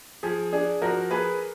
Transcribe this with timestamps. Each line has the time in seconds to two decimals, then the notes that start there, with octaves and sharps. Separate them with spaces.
0.23 F3 G#4
0.53 D4 G#4
0.82 F3 F#4 A#4
1.11 A#3 G#4 B4